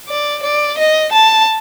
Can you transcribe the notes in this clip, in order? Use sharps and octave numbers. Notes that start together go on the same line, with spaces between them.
D5
D5
D#5
A5